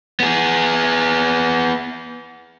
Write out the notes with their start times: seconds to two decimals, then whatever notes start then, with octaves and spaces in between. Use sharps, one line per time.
0.20 B3 G#4